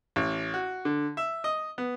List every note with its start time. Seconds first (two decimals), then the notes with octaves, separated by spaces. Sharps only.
0.16 A1
0.54 F#4
0.85 D3
1.17 E5
1.44 D#5
1.78 B3